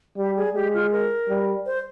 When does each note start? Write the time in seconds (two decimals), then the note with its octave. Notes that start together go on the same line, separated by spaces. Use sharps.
0.17 G3 G4
0.36 G#4
0.55 G#3 G4
0.74 F4
0.92 A#4
1.29 G3
1.66 C5